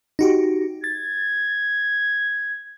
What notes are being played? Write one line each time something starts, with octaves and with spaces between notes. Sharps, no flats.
D#4 F#4 G4
G#6 A6